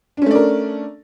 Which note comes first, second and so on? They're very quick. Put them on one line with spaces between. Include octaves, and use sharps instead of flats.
D4 C#4 A3 D5 A#4